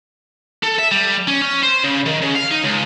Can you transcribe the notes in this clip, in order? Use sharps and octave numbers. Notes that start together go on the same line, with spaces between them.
A4
E5
G3
C#4
C#4
C5
C#3
D#3
C#3
F5
D#4
C#2